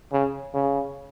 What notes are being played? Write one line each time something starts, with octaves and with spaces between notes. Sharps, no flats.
C#3
C#3